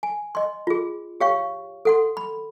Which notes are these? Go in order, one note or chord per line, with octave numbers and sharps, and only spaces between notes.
G#5
D#5 C6
F4 G#4
G4 C#5 F5 G5 C#6
A4 F#5 C6
B5